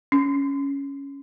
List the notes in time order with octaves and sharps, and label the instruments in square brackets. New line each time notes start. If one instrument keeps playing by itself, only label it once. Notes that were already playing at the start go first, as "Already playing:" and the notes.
[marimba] C#4